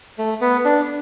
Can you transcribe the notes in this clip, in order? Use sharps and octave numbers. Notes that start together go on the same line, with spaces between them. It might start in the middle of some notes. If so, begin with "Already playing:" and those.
A3
B3
D4